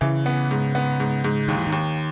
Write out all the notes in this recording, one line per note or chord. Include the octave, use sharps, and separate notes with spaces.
C#3 E3
B3
G#2
B3
G#2
G#2
D#2 D#3
E3
D#3
D#2